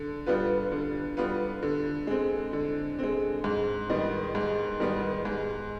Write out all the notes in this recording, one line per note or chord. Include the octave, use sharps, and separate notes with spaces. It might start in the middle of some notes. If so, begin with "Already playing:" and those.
Already playing: D3
G3 B3 F4 B4
D3
G3 B3 F4 B4
D3
G#3 C4
D3
G#3 C4
G#2
D#3 G3 B3
G#2
D#3 G3 B3
G#2